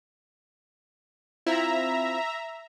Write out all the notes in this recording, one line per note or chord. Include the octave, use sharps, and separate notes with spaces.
C4 E4 F4 E5 A#5